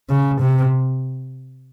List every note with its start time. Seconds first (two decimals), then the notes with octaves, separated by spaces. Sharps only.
0.10 C#3
0.40 C3